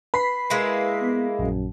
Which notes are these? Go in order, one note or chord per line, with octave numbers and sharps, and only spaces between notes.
B4 B5 B6 C7
G#3 A#3 E4
B3
A#1 F#2